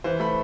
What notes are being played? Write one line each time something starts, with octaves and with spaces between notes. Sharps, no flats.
E3 C5
A3 B5